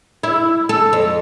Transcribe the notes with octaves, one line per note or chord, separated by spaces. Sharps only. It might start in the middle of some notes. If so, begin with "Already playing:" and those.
E4
A4
F2